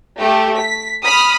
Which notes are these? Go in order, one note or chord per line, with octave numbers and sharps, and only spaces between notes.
A3 G4
B6
B5 D#6 F6